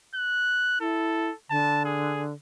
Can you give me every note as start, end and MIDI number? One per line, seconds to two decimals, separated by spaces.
0.15 0.76 90
0.80 1.30 64
0.80 1.35 69
1.50 2.34 50
1.50 1.81 81
1.85 2.25 68